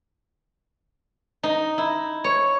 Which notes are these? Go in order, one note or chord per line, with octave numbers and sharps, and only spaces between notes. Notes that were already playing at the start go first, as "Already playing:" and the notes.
D#4
E4
C#5